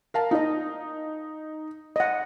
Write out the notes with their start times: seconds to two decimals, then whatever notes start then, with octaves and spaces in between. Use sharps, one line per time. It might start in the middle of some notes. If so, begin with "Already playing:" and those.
0.14 A#4 F5 A5
0.31 D#4 F4 D#5
1.96 D#5 F#5